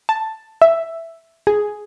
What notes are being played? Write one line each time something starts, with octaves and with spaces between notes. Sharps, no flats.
A5
E5
G#4